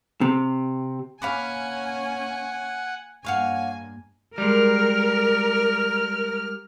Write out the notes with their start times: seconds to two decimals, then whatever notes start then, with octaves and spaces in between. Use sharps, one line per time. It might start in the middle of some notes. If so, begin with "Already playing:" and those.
0.21 C3
1.22 A#3 C#4 F5 F#5 G#5 B5 D6
3.25 G2 A#3 C#5 F5 F#5 G#5
4.38 G3 G#3 A#4 F6